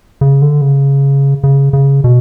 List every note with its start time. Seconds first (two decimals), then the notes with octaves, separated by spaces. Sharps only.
0.21 C#3
0.42 D3
0.61 C#3
1.44 C#3
1.73 C#3
2.04 B2